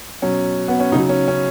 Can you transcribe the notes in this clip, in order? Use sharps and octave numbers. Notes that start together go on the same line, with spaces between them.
B2 F#3 C#4
B3
C#4
C#3 F#3 D#4
C#4
C#4